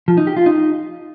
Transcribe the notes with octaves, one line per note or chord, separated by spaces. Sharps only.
F3
D#4
G4
F4
D#4